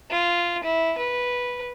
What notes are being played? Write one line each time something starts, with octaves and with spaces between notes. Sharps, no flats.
F4
E4
B4